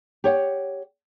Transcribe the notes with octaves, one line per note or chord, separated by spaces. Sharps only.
G4 C#5 F#5